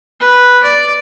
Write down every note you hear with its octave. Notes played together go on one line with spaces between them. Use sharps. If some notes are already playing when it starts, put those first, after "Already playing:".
B4
D5